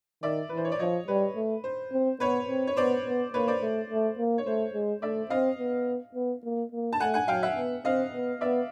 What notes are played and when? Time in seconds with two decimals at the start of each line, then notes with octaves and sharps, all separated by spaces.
0.23 D#3 D5 E5
0.49 E3 B4
0.57 C5
0.65 C#5
0.72 D5
0.79 F3 C#5 D#5
1.08 G3 B4
1.36 A3
1.64 C5
1.92 C4
2.20 B3 B4 C#5
2.49 C4
2.67 C#5
2.77 B3 C5 D5
3.05 B3
3.33 A#3 B4 C#5
3.48 C5 D5
3.62 A3
3.90 A3
4.18 A#3
4.38 C#5
4.46 A3 C5
4.74 G#3
5.02 A3 D5 E5
5.30 C4 D#5 F5
5.59 B3
6.15 B3
6.44 A#3
6.72 A#3
6.93 A5
7.00 A3 F#5 G#5
7.14 F#5 G#5
7.28 F#3 F5 G5
7.43 E5 F#5
7.56 B3
7.85 C4 D#5 F5
8.13 B3
8.41 B3 D5 E5